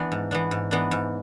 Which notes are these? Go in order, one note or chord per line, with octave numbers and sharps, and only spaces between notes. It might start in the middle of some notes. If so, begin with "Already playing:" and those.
Already playing: E3 B3 D4
G#2
E3 B3 D4
G#2
E3 B3 D4
G#2